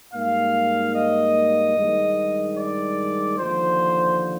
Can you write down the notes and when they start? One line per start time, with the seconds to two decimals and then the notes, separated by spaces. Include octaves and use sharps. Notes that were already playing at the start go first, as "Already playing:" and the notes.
0.13 G#2 G3 A#3 F5
0.95 D#5
1.76 G2 D#3 G#3
2.57 D5
3.38 D#2 D3 F3 C5